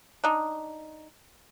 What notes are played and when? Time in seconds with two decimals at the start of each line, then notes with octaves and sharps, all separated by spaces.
0.24 D4 D#4